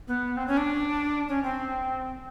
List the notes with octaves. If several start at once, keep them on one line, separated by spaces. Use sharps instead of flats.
B3
C4
C#4
D4
C#4
C4